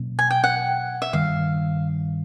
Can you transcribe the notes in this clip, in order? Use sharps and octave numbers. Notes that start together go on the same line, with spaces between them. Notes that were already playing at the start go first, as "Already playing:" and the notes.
Already playing: B2 F#3 A#3 C#4
G#5
G5
F#5
E5
G2 D#3 G3 F5